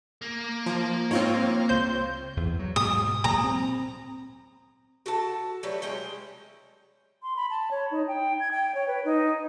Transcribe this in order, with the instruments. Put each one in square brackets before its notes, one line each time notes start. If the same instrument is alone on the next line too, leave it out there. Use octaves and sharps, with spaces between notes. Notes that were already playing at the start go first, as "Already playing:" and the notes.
[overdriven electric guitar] A#3
[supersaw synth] F3
[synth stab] G#2 [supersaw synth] C4 F4 C#5
[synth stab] C#2 C5 G6
[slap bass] E2
F#3
[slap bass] G#2 B2 [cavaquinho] D#6
[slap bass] D2 A#2 F#3 [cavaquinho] A#5 D#6
[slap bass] C4
[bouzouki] F#4 A4 A5
F#3 G3 A3 B4
G#3 C#4 G5
[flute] C6
B5
A5
C#5
D#4
G5
G#6
G5
C#5
B4
D#4